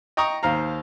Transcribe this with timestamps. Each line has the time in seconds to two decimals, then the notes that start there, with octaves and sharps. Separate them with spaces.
0.17 D#5 G5 A#5 C#6 D#6
0.43 D#2 C5 F5 A#5